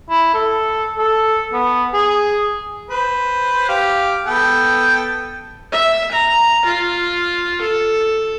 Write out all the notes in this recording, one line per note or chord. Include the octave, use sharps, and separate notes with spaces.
E4
A4
A4
B3
G#4
B4 C5
G4 F5
B3 A4 G5
E5
A#5
F4
A4